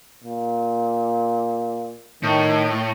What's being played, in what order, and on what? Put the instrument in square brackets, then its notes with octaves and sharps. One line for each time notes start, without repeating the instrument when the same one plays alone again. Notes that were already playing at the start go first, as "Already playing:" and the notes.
[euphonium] A#2
[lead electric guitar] A2 [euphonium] D#3